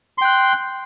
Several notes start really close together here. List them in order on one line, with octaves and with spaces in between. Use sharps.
C6 G5 F#6